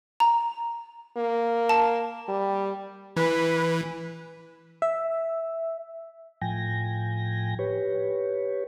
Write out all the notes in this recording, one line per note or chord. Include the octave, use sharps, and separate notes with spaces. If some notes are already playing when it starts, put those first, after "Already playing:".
A#5
A#3
A5
G3
E3 B4
E5
A2 F3 G5 G#5 A#6
G4 B4 C#5